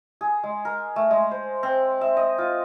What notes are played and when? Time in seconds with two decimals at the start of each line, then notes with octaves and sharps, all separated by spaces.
0.21 G#4
0.43 G#3
0.65 A#4
0.96 A3
1.11 G#3
1.31 C5
1.63 C4
2.01 E5
2.17 D#5
2.38 F4